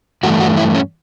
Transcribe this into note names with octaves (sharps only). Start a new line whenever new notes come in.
G2 E3 A3 F#4
F#4
E4
C#4